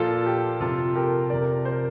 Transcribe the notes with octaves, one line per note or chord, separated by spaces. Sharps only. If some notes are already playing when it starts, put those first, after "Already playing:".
Already playing: A#2 F3 F4 A4
G4
C3 F3 F4 A4
G4 A#4
C3 F3 A#4 D5
C5
A#4